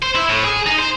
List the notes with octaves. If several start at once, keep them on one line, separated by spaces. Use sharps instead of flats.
C5
E4
A2
G#4
D#4
C5